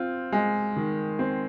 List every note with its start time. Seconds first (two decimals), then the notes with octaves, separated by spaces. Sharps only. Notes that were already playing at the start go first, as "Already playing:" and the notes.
Already playing: C4 F4
0.32 G#3
0.76 D#3
1.19 C4